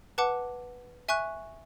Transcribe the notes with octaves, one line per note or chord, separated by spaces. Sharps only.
B4 F#5 A5 D6
E5 G#5 C#6 F#6